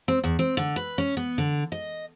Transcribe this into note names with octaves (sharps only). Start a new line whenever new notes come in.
C4
E2
C4
D3
B4
C#4
B3
D3
D#5